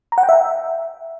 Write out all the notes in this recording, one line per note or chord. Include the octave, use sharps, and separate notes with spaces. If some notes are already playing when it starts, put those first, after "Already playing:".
A#5
F#5
G5
E5